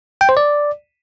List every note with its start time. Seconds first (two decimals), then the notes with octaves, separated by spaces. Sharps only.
0.21 G5
0.29 C5
0.37 D5